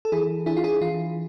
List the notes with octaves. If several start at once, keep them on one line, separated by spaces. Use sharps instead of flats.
A4
E3 E4 G#4
D4 E4 G#4
F4
E4 G#4
E3 F4